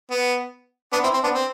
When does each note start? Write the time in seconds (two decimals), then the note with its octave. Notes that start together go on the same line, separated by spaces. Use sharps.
0.11 B3
0.93 B3 D4
1.03 C4 E4
1.14 C4
1.24 B3 D4
1.34 C4